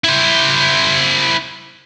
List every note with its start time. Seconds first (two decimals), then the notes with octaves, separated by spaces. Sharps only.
0.04 E4 C5